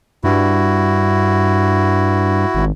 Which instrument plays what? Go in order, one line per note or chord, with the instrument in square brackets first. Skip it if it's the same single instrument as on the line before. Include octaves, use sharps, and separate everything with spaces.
[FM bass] G2 [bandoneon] E4 F#4
[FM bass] G#1